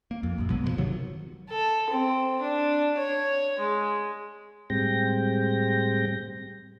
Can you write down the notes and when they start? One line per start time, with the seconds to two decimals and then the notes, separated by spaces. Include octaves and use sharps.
0.11 A#3
0.23 F2
0.38 A#1 F#2
0.50 B2 F#3 G#3 B3
0.64 G#1 D3 F3
0.78 C3 D#3 F#3
1.50 A4
1.90 C4
2.42 D4
2.98 C#5
3.60 G#3
4.70 A2 G3 G#3 C4 G5 A#6